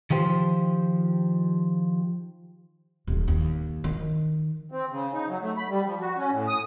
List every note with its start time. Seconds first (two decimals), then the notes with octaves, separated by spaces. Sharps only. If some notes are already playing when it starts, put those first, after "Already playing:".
0.10 D#3 F3 G4 C5
3.07 D#1
3.28 D#2
3.84 D#3
4.72 C4
4.89 C#3
5.13 D#4
5.29 F#3
5.42 A3
5.57 B5
5.69 G3
5.84 F3
6.01 F#4
6.17 C#4
6.32 A2
6.48 D#6